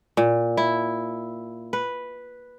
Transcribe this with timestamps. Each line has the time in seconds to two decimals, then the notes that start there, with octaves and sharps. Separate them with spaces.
0.17 A#2
0.57 E4
1.73 B4